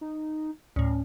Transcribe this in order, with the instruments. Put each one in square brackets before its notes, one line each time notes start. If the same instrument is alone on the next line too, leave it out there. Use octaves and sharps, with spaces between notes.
[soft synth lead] D#4
[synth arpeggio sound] D2 A2 [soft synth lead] C#4